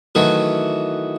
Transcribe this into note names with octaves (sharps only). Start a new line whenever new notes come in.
D#3 E3 F#3 A3